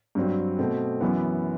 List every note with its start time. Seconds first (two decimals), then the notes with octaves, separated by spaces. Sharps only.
0.15 G2 F#3 C4
0.59 B2 A3 C4
1.01 F#2 E3 B3